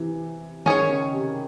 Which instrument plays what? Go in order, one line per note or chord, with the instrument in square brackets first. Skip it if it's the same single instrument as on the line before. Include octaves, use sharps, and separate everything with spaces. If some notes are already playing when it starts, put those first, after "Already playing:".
Already playing: [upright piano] C3 E3
[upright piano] D#3 [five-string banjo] C#4 G#4 C#5
[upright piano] C#3
C3